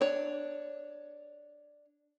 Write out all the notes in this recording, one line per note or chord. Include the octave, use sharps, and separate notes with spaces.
D4 C#5